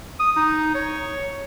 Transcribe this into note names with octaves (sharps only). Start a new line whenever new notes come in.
D#6
D#4
C#5